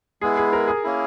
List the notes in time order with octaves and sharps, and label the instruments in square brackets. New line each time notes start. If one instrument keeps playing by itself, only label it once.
[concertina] G#3 B3 E4 [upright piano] G#4
[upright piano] G#4
A#4
G#4
[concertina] A#3 C#4 E4